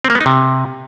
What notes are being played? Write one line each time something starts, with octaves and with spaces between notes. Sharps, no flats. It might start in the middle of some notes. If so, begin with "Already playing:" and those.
C4
A#3
B3
D#4
C3